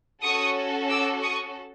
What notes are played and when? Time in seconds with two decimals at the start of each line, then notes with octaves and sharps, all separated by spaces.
0.22 C#4 F#4 A4 C#6 D#6
0.89 D6 E6
1.22 C#6 D#6